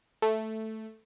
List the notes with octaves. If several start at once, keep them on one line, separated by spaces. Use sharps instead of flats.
A3